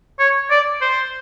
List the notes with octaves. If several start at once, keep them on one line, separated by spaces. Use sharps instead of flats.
C#5
D5
C5